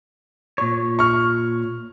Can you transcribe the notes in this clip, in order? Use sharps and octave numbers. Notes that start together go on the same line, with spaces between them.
A#2 C#5
C#6 F6